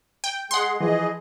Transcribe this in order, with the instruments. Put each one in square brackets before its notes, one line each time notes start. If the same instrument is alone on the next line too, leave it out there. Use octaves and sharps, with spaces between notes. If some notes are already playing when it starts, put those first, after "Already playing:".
[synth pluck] G5
[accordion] G#3 G#4 [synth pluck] F#5 C6
[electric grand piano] E3 F3 [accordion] G#4 D#5